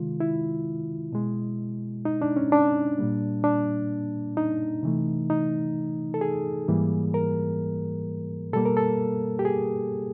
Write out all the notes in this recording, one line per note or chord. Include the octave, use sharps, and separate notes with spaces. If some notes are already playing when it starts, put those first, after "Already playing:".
Already playing: C3 D#3 G#3 F4
E4
B2 G#3
D#4
D4
C#4
D4
A#2 G3 A#3
D4
D#4
C3 E3 A3
D#4
A4
G#4
G#2 E3 G3 A#3
A#4
B2 G3 A#3 A4
A#4
A4
G4
G#4